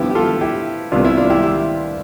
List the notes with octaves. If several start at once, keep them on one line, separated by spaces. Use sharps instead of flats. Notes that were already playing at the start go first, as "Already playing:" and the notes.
Already playing: G2 F3 B3 E4 G4
G4
F4 A4
E4 G4
C2 C3 G3 B3 D4 F4
E4
D4 F4
E4 G4
E4 G4